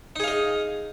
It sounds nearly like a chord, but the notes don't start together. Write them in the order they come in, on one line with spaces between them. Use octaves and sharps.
D#4 G#4 F5 D#5